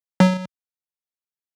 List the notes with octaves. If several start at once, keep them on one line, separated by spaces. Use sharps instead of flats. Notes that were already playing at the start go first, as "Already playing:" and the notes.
F#3